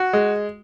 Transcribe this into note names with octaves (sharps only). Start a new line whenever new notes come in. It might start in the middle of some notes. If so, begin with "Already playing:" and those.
Already playing: F#4
G#3